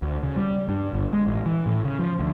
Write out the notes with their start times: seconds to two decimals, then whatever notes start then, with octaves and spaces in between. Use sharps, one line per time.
0.02 D2
0.23 C#3
0.36 G3
0.69 G2
0.94 G1
1.13 G#3
1.27 A1
1.46 E3
1.66 A2
1.85 C#3
1.99 F3
2.20 D2